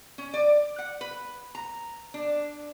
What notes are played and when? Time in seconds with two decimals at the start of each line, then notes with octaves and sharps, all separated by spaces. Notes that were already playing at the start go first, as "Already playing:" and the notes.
0.18 C#4
0.34 D5
0.79 F#5
1.01 B4
1.55 A#5
2.14 D4